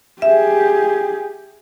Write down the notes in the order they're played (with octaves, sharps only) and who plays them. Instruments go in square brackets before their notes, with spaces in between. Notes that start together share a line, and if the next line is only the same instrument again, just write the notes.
[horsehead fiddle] G4 G#4 [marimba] E5